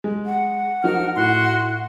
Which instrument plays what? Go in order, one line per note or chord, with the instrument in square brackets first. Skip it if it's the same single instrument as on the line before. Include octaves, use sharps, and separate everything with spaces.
[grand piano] G#3
[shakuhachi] F#5
[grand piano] F3 D#4 F#4 [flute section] A#4 F6
[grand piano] A2 [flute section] F#4 C6 F#6